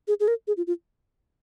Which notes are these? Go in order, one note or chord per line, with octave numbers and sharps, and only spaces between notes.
G#4
G#4
A#4
G#4
F4
F4